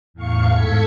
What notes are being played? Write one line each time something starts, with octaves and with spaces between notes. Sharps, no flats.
E2 A2 F5 C#6 C#7
G#2 A4 G#6 B6 C#7